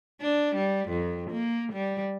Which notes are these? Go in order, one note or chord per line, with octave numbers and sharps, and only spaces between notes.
D4
G3
F2
A#3
G3